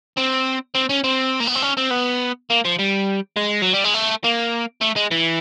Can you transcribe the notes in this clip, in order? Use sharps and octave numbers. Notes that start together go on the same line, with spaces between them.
C4
C4
C#4
C4
A#3
B3
C4
C#4
C4
B3
A#3
F3
G3
G#3
F#3
G3
G#3
A3
A#3
A3
G#3
E3